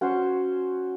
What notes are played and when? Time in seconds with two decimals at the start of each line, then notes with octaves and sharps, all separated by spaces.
0.01 C#4 F#4 C5